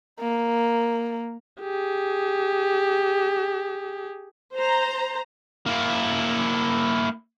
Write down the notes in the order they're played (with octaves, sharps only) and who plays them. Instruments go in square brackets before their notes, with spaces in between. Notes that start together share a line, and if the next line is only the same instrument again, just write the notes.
[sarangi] A#3
[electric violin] G4 G#4
[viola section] C5 A#5
[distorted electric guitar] A#3 E4